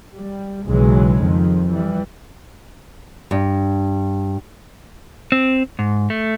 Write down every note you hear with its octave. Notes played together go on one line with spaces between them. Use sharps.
G3
B1 C#3 E3 F#3 G#3
F2 D#3 F3
E3 G3
G2
C4
G#2
A3